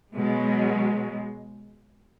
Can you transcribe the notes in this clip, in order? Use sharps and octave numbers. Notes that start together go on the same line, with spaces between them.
B2 F#3 G#3